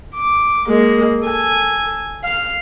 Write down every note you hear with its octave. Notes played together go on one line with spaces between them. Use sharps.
D6
G#3 A#3
A4 G#5
F5